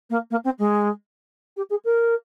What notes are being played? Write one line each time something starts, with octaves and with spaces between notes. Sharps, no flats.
A#3
A#3
C4
G#3
G4
G#4
A#4